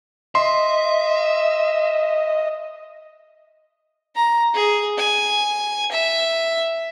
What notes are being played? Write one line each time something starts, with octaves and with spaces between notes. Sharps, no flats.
D#5 E5 C6
A#5
G#4
G#5
E5